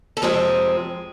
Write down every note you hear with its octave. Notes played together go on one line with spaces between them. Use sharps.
A4
F2 C3 F3 G#3 C4 G#4